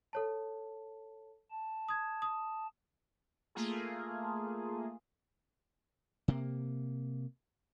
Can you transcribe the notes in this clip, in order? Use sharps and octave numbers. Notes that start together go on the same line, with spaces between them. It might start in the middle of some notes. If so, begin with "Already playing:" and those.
A4 C#5 A5
A5
D#6 G#6
D#6
A3 A#3 F4 G#4
C3 A#3